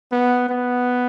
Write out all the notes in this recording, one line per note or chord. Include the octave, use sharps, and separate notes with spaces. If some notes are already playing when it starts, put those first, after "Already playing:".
B3
B3